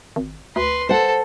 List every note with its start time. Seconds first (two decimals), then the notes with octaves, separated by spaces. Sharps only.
0.16 G#1
0.56 D2 B4 C6
0.89 A4 C5 F#5